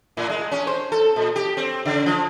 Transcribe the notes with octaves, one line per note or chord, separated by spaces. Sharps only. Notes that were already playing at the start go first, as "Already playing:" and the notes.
A2
G#3
C#4
C5
A4
A#2
G4
C4
C#3
F3